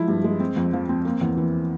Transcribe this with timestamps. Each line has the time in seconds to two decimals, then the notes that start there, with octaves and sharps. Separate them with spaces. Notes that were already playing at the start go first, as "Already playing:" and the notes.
Already playing: F3 G#3 E4
0.08 G2
0.24 G#3
0.40 C4
0.56 F2
0.73 F3
0.89 C4
1.05 A#3
1.21 E2
1.37 E3